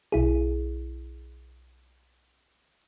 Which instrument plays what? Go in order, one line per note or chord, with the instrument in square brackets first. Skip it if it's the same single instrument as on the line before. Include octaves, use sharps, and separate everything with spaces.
[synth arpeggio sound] B1 E4 G#4